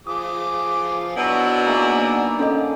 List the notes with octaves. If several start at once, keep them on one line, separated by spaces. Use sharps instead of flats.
F3 G#4 D6 D#6
B2 F#3 D4 E4 F#5
A#3 D#4 G#4
D3 C#4 A4 D#5